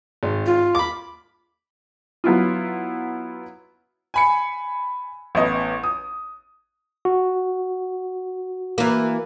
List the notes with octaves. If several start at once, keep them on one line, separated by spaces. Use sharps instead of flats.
G#1
F4
B5 D6
F#3 B3 E4 F4
G#5 B5 C#7
A1 B3 D#5
D#6
F#4
E3 A#3